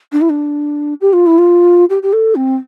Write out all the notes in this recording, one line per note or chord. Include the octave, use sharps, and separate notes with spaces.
D4
E4
D4
G4
F4
E4
F4
G4
G4
A4
C4